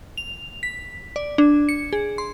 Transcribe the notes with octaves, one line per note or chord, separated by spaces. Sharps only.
F7
B6
D5
D4
C#7
G#4
C6